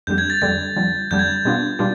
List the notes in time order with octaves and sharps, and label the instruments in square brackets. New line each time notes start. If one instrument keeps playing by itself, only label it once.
[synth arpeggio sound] F2 D3 G3 [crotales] G6
[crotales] G#6
A6
[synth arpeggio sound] F2 D3 G3 [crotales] A6
[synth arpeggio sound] F2 D3 G3
[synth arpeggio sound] F2 D3 G3 [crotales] G6
[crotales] G#6
[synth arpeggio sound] B2 G3 B3 D4 F4
B2 G3 D4 F4